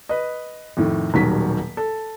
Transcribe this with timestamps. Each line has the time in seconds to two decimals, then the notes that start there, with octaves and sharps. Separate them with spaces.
0.09 B4 D#5
0.77 F2 A2 D#3
1.14 D#1 B2 D#3 F#3 G3 B6
1.77 A4